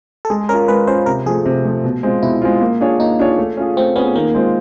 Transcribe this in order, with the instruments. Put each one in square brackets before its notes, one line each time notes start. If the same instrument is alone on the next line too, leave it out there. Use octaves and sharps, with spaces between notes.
[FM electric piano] A4
[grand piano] G#3 [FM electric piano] G#4
[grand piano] C#4 F4 [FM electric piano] A#4
[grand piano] G#3 [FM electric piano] B4
[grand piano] C#4 F4 [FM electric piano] C5
[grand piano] C3 [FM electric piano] A#4
[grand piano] F3 A3 [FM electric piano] G#4
[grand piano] C3
F3 A3
B2
G#3 C4 F4
[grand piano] B2 [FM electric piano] E4
[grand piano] G#3 C4 F4
A#3
D4 F4 G#4 C#5
[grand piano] A#3 [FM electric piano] D#4
[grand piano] D4 F4 G#4 C#5
A3
C#4 F4 G#4
[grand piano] A3 [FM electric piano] C4
[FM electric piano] B3 [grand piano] C#4 F4 G#4
[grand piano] D#3 [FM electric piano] A#3
[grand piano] G#3 C4 F4